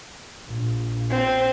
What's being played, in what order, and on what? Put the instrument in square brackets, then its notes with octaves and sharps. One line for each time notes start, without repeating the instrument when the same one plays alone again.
[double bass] A#1
[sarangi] C4